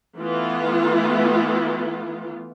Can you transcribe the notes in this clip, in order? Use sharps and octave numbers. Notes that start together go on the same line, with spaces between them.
E3 A3 B3 F4